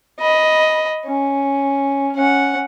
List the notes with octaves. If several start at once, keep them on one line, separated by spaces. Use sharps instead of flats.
D#5 B5
C#4
C#4 F#5